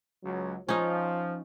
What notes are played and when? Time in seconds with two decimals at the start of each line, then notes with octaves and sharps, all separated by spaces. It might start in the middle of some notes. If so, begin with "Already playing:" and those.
0.24 C#2 F#3
0.69 F3 C#4 D#4